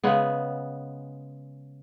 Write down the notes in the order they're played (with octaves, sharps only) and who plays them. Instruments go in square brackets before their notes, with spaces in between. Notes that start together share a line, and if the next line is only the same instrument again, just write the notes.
[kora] C#3 G#3 B3